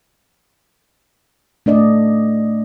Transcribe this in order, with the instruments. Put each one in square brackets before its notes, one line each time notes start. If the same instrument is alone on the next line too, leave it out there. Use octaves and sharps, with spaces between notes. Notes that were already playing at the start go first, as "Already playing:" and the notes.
[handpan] A3 D4 D5 D#5